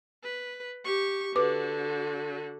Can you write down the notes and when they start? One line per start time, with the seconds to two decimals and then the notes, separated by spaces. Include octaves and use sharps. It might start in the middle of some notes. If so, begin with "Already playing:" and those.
0.23 B4
0.85 G4 C#6
1.36 D3 F#4 G4 B4 D6